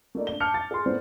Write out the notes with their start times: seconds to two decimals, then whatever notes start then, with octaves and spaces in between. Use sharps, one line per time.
0.15 A3 A#3 D#4 D5
0.27 D4 G7
0.40 A5 D6 F6 G6 C#7 F7
0.54 A6
0.71 G#4 C6
0.86 A3 B3 E4 B4 C5 D5